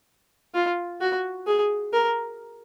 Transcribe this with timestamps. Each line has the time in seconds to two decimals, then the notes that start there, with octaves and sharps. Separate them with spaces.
0.54 F4
1.01 F#4
1.47 G#4
1.93 A#4